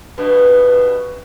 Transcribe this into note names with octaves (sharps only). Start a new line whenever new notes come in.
G2 B2 B3